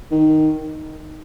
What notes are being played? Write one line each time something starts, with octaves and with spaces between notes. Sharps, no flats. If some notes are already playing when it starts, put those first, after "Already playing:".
D#3